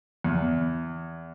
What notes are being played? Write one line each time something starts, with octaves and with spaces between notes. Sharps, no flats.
E2